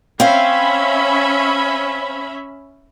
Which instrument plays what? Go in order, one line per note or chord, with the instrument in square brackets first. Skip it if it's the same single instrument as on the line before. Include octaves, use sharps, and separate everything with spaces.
[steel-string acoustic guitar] C4 F5 [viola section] C#4 E5 B5